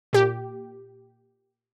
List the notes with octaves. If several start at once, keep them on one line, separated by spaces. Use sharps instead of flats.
A#2 G4